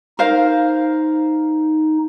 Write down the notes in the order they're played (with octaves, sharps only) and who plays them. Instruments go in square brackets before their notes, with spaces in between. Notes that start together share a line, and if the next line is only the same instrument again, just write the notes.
[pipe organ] D#4 [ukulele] A#4 C5 F5